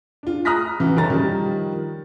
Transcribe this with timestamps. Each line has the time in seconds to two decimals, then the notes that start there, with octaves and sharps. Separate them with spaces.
0.23 D4 F4
0.45 A#5 D#6 F6 F#6 A#6 B6
0.80 E3 F#4
0.96 F#1 D#3 C#4 A4 A#5 A6
1.10 D#3 F3 G3